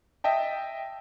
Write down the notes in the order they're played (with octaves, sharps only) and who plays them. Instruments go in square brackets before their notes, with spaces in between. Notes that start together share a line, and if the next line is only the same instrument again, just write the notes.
[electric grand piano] D#5 E5 G5 A5